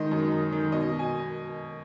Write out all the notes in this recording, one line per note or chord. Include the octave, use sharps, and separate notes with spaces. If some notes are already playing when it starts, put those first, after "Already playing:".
Already playing: D#3 G#3 D#5
F#2
F#2
D#3
B2 D#5
B2
G#5